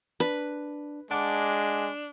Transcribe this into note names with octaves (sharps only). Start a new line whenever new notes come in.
D4 B4
G#3 D4 F#5 A5 D6